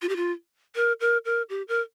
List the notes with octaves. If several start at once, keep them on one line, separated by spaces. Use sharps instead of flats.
F4
G4
F4
A#4
A#4
A#4
G4
A#4